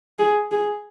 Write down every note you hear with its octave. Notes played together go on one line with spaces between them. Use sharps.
G#4
G#4